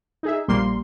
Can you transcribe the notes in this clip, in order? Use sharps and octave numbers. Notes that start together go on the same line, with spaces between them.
D#4 G#4 E5
A#1 G3 A#3 C6